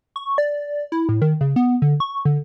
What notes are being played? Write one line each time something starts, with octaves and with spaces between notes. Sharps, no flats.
C#6
D5
E4
A2
D#3
C#3
B3
D3
C#6
D3